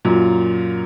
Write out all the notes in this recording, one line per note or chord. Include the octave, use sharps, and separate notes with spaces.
F#2 A#2